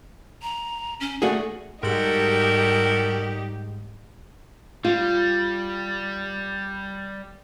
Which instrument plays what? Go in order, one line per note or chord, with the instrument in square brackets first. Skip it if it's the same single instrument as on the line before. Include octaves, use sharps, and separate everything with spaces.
[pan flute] A#5
C#4
[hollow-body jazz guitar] A3 F#4 G#4 [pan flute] D5
[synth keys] G#2 [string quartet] G3 D#4 G4 [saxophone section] F#4 A4 A#4
[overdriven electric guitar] G3 [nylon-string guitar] F4